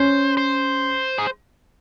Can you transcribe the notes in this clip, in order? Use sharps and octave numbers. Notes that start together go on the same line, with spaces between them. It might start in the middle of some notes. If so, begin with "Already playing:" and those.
Already playing: C#4 C5
C5
G#4